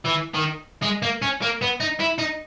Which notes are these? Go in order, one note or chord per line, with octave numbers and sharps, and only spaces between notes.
E3
D#3
G#3
A#3
C#4
A#3
B3
D#4
E4
D#4